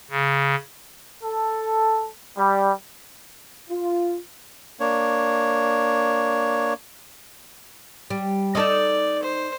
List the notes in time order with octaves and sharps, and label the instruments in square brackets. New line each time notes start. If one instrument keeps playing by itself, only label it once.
[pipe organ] C#3
[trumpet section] A4
G3
[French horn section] F4
[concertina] A#3 D4 C#5
[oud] G3
[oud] D#4 A4 D#5 [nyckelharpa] D5
[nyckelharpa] C5